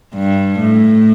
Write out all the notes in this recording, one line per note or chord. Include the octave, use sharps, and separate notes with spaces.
G2
A2